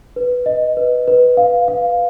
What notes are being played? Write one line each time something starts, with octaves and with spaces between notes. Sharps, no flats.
B4
D#5
B4
B4
F5
F5